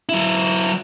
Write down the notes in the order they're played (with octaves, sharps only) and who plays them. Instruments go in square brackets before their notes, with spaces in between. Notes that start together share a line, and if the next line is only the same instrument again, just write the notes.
[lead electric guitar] F#3 E4